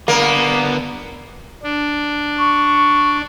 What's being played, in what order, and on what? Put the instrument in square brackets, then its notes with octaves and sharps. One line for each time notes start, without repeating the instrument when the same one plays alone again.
[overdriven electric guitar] D3 B3 [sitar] A#3
[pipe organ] D4
[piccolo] C#6